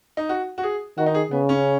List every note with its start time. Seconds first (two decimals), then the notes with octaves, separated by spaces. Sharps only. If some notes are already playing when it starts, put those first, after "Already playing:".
0.17 D#4
0.29 F#4
0.58 F#4
0.63 G#4
0.98 D#3 F#4
1.06 D#4
1.14 G#4
1.31 C#3 B3
1.49 C#4